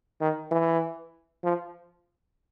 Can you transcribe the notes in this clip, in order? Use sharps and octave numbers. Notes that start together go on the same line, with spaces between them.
D#3
E3
F3